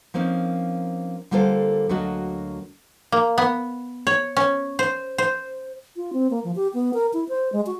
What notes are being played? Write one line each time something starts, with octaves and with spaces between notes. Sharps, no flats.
F3 A#3 C4 C#4 D#4
D3 G3 A#3 F4 A4 C5
D2 F#3 A#3 D4 F#4 D#5
A#3
B3
C#5
C#4
C5
C5
F4
C4
A#3
F3
G4
B3
A#4
E4
C5
G#3
F#4